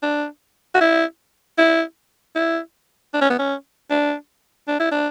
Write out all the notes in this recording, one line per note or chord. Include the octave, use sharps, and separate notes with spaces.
D4
F#4
E4
E4
E4
D4
C#4
B3
C#4
D4
D4
E4
D4